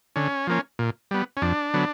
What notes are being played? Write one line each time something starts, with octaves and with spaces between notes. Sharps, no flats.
D3 C#4
F3 A#3 C#4
A#2
G3 B3
C#4
F2 D4
D3 F#3 B3